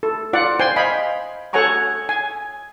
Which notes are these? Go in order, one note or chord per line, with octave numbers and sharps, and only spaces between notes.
A4
F4 D5 F#5 D6
C5 G5 G#5 C6
D#5 F5 G#5 B5
A4 C#5 F#5 G#5 A#5 C#6
G#5